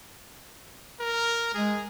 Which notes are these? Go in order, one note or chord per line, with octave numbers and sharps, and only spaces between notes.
A#4
G#3 G#4